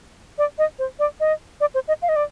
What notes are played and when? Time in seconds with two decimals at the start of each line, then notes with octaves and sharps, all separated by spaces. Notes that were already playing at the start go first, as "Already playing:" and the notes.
0.38 D5
0.58 D#5
0.79 C5
0.99 D5
1.20 D#5
1.61 D5
1.74 C5
1.88 D#5
2.02 F5
2.09 D#5
2.16 D5